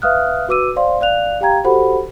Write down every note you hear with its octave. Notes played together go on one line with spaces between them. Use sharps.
B4 E5 F5 D#6 F6 F#6
F#4 B4 D6 E6 D#7
C5 D5 F5 C6
D5 F5 F#6 F7
G4 F5 G5 A#5 G#6
F#4 G4 A4 C5 F#5 B5